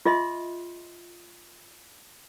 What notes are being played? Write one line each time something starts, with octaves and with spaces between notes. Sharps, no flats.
F4 G#4 D#5 E5 C6